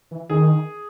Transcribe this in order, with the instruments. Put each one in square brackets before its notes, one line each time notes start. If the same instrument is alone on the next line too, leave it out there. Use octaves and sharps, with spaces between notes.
[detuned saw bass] E3
[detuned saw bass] D#3 [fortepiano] G#4